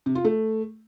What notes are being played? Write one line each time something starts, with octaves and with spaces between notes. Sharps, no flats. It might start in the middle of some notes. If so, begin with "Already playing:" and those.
C3
F4
A3